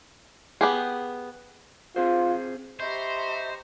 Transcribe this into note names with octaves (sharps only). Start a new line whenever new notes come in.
B3 G4 G#4
C4 F4 G#4 C5
G4 C5 D#5 E5 A#5 B5 C#6